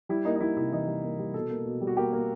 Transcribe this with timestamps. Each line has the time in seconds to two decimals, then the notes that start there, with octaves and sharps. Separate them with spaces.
0.09 G3 E4
0.25 A#3 D#4
0.35 D#4
0.41 G3 E4
0.57 C3 E4
0.72 E3 D#4
0.87 G3
1.04 A#3
1.19 G3
1.34 B2 A4
1.50 A#3
1.66 B2
1.81 G3
1.87 F#4
1.97 A#3 G4
2.13 A#3